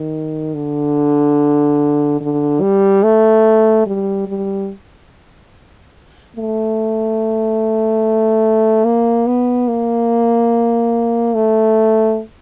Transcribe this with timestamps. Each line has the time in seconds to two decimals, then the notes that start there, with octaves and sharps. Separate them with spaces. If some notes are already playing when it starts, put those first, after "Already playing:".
Already playing: D#3
0.54 D3
2.21 D3
2.61 G3
3.03 A3
3.86 G3
4.27 G3
6.36 A3
8.85 A#3
9.27 B3
9.68 A#3
11.35 A3